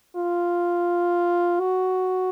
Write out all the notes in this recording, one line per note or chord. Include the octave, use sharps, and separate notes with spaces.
F4
F#4